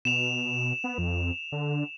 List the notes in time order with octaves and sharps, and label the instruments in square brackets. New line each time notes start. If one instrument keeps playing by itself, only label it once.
[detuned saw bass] B2 [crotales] E7 F7
[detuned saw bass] B3
F2
D3